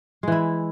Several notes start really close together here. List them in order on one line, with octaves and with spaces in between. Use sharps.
G#3 E3 E4